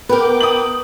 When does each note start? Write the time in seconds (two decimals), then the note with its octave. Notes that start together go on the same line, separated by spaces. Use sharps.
0.09 B3 A#4 B4 G5 D6
0.40 D#6 F#7